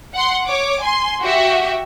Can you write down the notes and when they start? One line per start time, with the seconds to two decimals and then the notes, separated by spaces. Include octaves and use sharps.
0.14 F#5 C6
0.47 C#5 D6
0.82 G#5 C6
1.22 F#4 G4 E5